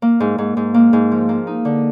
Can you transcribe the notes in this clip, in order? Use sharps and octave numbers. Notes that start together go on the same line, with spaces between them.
A#3
G#2
G#2
G#2
A#3
G#2
F3
A#3
D#4
D3